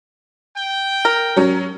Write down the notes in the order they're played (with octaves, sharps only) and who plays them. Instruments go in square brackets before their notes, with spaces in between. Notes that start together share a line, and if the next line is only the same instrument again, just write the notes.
[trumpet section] G5
[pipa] A#4
[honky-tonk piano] F#3 C#4